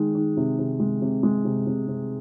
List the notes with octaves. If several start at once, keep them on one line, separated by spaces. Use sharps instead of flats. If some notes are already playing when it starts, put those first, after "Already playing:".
Already playing: D#3 G#3
D#3
C3
C3
G#3
C3
G#3
C3
C3
C3